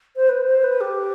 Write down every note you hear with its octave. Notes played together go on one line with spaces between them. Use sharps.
C5
B4
C5
B4
G4